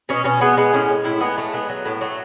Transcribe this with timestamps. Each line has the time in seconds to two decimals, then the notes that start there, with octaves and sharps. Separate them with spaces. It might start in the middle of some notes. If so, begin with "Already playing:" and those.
0.09 B2 C#4
0.24 B2 C#4
0.41 G#3 B3
0.57 G#3 B3
0.73 A2 C#4
0.88 G#3
1.04 A2 E4
1.21 G#3 B3
1.37 A2 A3
1.54 G#3 B3
1.69 F#3
1.86 A2
2.01 F#3 A3